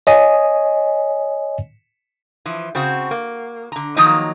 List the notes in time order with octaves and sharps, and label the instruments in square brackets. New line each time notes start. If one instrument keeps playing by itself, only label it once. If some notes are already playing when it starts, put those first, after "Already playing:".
[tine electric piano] C#5 D#5 G#5
[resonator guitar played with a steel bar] E3 F3
C#3 C4 F#4
A#3
D3 A#5
D#3 F3 F#3 A#3 D#4 D#5